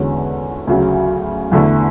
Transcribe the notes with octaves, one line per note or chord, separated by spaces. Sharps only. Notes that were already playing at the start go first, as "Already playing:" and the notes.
Already playing: E2 D3 G#3 C#4 F#4
D2 C#3 F#3
E2 D3 A3 E4